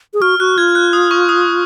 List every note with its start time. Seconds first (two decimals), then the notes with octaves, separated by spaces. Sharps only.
0.14 G#4
0.21 F#4 F6
0.39 F#4 F#6
0.58 F4 G#6
0.75 F#6
0.93 D#6
1.11 C#6
1.29 D#6